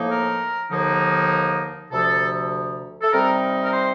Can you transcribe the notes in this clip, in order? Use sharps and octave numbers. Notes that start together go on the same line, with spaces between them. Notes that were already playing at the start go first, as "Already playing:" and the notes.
Already playing: A2 F3 A#3 D#4
A#4
D#2 D3 F3 A#3 D#4
D2 C3 F3 A4
A4
C3 G3 C4 D#4 A#4
A#4
C5